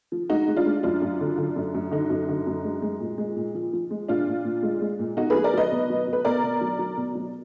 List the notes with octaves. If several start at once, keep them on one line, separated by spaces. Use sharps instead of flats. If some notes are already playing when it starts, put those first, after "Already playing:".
F3
G#3 D#4 F#4
G#3
D4 F4
G#3
F#2 D4 F4
F#2
D3
D3
F#2
F#2
D3 D#4
F#2
D3
F#2
G#3
G#3
A#2
G#3
A#2
F3
F3
G#3
A#2 D4 F4
A#2
A#2
G#3
G#3
A#2
B2 D#4 F#4
F#3 G#4 B4
A#4 D5
F#3 B4 D#5
B2
F#3
B2 B4
B2 A#4 D5
B2
F#3
F#3
B2
F#3